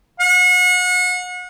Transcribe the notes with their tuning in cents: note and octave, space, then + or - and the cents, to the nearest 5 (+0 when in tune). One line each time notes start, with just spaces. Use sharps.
F#5 -35